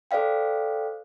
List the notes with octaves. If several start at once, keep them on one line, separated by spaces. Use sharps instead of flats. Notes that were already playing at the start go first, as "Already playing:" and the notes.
A4 C5 D5 F5 G5